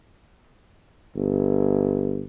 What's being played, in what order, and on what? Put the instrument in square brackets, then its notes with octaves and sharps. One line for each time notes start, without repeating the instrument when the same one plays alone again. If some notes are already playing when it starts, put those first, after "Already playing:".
[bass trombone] G1